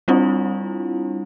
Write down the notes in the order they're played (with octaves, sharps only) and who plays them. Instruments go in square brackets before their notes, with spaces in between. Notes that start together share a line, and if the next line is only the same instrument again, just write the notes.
[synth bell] G3 C4 D4 E4 F4